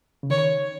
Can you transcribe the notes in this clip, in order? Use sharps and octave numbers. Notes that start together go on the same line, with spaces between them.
C#3
D#3 C#5